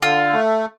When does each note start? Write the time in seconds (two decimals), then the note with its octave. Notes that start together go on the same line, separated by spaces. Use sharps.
0.02 D3 F4
0.33 A3